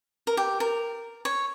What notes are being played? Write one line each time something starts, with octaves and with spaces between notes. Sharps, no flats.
A#4
G4
A#4
C#5